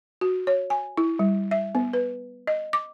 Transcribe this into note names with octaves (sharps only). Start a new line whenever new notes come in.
F#4
C#5
G#5
E4
G3
E5
B3
B4
D#5
D6